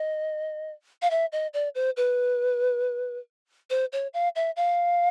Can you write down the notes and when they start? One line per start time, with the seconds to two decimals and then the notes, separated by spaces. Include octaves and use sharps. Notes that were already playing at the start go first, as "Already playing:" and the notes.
Already playing: D#5
1.02 F5
1.10 E5
1.32 D#5
1.53 D5
1.75 C5
1.97 B4
3.70 C5
3.92 C#5
4.13 F5
4.35 E5
4.56 F5